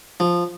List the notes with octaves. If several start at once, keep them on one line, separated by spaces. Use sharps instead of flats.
F3